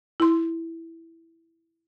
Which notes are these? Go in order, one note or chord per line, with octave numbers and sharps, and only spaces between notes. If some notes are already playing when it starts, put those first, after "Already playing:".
E4 C6